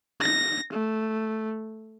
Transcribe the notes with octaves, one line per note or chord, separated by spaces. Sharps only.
A#6
A3